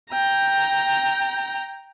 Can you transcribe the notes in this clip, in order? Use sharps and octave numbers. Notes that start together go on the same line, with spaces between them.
G5 A#5